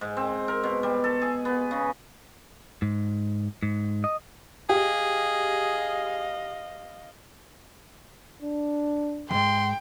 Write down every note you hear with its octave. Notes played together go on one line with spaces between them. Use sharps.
G#2
C4
A#4
B2
G3
A4
G#4
B3
C#3
G#2
G#2
D#5
G4 G#4 D#5 F5
D4
E2 G#2 G5 C6